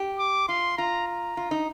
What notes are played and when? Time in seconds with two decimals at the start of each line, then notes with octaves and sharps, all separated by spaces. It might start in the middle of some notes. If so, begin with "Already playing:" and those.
Already playing: G4
0.19 D6
0.49 F4 C6
0.77 F4 A#5
1.07 A#5
1.37 F4
1.51 D#4